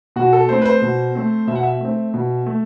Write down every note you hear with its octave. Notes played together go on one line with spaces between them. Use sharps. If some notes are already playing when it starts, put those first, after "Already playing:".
B2 F#4
A4
A3 C4 C5
B4
C5
B2
A3 C4
B2 E5
F#5
E5
A3 C4
B2
A3